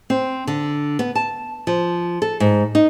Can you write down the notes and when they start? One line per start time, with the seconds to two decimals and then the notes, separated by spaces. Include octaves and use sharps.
0.10 C4
0.47 D3
0.99 B3
1.15 A5
1.67 F3
2.22 A4
2.40 G#2
2.75 D#4